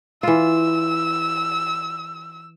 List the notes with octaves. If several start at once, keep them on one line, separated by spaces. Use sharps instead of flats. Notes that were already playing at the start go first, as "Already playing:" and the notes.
E3 F4 E6